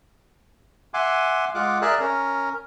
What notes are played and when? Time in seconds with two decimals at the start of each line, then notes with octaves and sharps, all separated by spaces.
0.94 E5 F#5 G#5 C6 D6
1.54 G#3 F4 F#5 D6
1.82 G#4 A#4 D5 E5 F#6
2.00 C#4 A#4